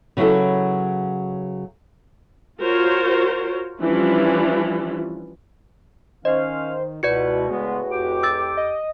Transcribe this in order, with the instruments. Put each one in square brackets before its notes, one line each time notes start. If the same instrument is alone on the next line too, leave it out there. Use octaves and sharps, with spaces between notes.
[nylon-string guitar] C#3 F#3 B3 E4 A4
[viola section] F4 F#4 A#4 C5 C#5
E3 F3 G3 C#4 D4 E4
[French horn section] D#3 [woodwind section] C#4 F5 [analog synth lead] C5 [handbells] D#5
[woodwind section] C#2 B2 [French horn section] E4 B4 [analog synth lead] F#4 [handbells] D5 G#6 C#7
[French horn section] A2 G#4 B4 [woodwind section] C#3 G#3 B3
[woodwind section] F2 G4 D6
[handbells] E6 A6
[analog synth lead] D#5